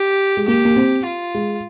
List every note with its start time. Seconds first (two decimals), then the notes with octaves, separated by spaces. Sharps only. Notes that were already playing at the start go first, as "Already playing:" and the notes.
Already playing: G4
0.37 G#3
0.48 A#3 G4
0.65 A#3
0.76 C4
1.05 F4
1.34 G#3